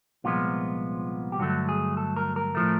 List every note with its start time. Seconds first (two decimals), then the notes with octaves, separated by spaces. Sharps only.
0.24 C2 A#2 F3 G#3 B3 F4
1.32 G4
1.39 G2 D3 F#3 A3 F#4
1.69 G#4
1.97 A4
2.16 A#4
2.36 A#4
2.55 A2 F3 A3